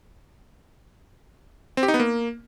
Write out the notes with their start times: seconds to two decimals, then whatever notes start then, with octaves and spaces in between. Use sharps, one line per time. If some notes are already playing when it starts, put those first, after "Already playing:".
1.77 C4
1.83 G4
1.88 D#4
1.94 B3
1.99 A#3